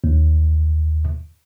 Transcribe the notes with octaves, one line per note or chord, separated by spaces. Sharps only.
D#2